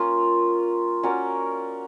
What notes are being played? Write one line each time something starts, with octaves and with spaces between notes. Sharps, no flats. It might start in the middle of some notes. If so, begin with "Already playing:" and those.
Already playing: A#3 C#4 F4 A#4
C#4 F#4 A#4 D5